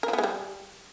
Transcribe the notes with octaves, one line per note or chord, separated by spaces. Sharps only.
A#4
F3
B3
G#3
G3